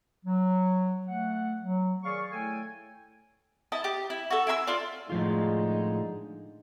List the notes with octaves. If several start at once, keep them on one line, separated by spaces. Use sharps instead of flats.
F#3
A3 F#5
F#3
D#3 G#4 D5 F5 G#5 C#6
A3 E4 A4 C#5 G5 G#5
E4 D#5 A5
G4
E4
F#4 A4
E4 G#5 B5 E6
F4 A4 D5
A2 D3 F3 G#3 D#4 F4